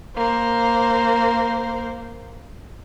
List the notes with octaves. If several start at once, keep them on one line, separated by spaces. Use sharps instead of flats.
A#3 C5